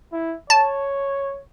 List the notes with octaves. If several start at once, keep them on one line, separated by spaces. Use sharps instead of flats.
E4
C#5 A5